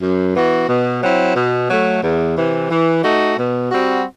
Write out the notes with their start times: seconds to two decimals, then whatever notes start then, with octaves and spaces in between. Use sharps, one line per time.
0.01 F#2
0.34 E3 B3 F#4
0.68 B2
1.01 F#3 C4 E4
1.35 B2
1.68 F#3 A3
2.01 E2
2.36 C3 E3
2.69 E3
3.02 A3 D#4 F#4
3.37 B2
3.70 G3 C4 F#4